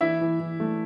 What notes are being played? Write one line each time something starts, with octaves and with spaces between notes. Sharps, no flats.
E3 E4 E5
E3
E3
A3